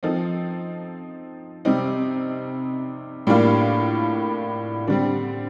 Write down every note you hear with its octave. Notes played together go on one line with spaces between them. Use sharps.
F3 C4 D#4 A4
C3 G3 C4 D#4
A2 G3 A#3 D4 F4
D3 G3 C4